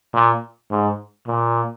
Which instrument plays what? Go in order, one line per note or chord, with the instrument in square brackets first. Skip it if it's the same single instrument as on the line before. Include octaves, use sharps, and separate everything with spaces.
[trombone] A#2
G#2
A#2